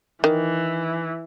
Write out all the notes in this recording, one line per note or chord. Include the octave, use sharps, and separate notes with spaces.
D#3 E3